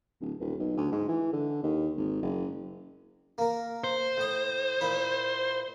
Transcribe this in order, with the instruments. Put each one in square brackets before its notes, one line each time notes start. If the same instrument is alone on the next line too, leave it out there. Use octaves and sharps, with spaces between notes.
[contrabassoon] D1
D#1
B1
D2
G#2
E3
D3
D#2
G#1
F#1
[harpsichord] A#3 A#4
[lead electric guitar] C5
[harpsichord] A2 D#5
A#2 E4 B4